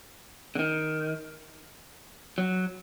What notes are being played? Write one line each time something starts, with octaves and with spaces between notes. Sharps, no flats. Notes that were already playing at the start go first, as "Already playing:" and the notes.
D3
D#3
F#3